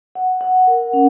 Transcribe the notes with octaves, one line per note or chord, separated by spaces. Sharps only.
F#5
F#5
A#4
C#4